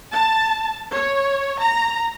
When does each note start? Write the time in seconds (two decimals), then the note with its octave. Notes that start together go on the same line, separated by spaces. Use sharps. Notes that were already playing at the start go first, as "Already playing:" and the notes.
0.14 A5
0.94 C#5
1.61 A#5